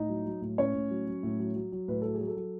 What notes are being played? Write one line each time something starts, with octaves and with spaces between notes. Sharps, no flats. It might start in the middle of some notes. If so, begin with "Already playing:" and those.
Already playing: A2 D#4 D#5
F#3
F#3
A2
A2 C#4 C#5
A2
F#3
F#3
A2
F#3
F#3
F#3
A2 B4
F#3 A4
G#4
F#3
A4
F#3